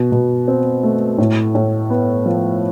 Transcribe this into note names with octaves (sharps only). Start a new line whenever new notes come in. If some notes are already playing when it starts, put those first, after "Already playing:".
Already playing: B2
B2
C4
A3
A2
A2
B3
F3